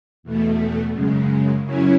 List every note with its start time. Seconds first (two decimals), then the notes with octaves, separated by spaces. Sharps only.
0.23 E2 B2 A3
0.93 F#2 C#3 G#3
1.62 F#2 C#3 F#3 C#4 E4